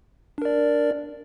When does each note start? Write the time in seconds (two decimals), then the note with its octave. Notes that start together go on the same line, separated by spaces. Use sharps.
0.38 D4
0.42 A#4
0.45 D5